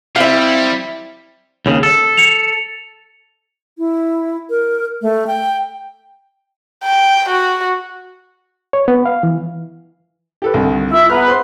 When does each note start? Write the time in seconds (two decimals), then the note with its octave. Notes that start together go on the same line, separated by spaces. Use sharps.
0.16 G3 C4 E4 E5 F5
1.66 D#2 C#3
1.83 A4
2.17 C#7 F7
3.78 E4
4.50 A#4
5.02 A3
5.27 G5
6.83 G5
7.29 F#4
8.73 C#5
8.88 B3
9.06 F5
9.23 E3
10.42 G4 A4 B4
10.54 C2 D3 D#3
10.90 E4 F4 E5
11.10 B3 G#4 B4 A#5 F6
11.28 C5 C6